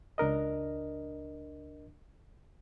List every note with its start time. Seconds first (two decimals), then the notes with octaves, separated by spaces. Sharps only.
0.18 C#2 D4 A#4 D#5